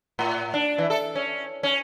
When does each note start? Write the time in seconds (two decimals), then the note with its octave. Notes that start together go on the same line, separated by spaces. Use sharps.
0.19 A2
0.54 D4
0.78 E3
0.90 A4
1.15 C#4
1.63 C#4